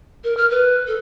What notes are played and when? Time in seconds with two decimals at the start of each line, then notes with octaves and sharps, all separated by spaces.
0.24 A#4
0.37 F6
0.51 B4
0.87 A4